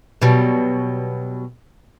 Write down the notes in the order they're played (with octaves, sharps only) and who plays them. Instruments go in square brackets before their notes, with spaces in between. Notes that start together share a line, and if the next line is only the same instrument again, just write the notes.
[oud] B2 F#3 G3